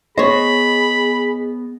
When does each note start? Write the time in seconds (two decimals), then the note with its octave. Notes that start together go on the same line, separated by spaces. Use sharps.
0.18 B3 G#4 C5 C#5 D#5 B5